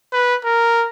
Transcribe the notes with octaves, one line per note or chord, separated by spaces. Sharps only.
B4
A#4